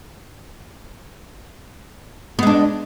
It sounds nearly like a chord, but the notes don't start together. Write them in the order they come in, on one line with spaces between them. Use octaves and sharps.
B3 G#3 D4